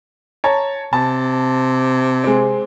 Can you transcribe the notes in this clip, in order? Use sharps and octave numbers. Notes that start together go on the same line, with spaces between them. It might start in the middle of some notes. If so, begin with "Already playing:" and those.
C#5 A5 A#5
C3 A5
G#3 C4